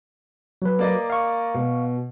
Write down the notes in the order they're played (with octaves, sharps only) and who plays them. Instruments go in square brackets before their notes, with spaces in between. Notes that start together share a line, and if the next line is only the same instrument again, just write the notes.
[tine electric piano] F#3 B4
[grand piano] A#3 D5 D#5
[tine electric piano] F5 C#6
[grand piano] B2